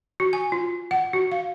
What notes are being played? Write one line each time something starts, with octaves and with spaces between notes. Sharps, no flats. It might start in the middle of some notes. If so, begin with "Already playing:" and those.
F#4
G#5
F4
F#5
F#4
F5